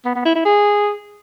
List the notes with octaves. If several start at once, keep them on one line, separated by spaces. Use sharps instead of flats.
B3
B3
E4
E4
G#4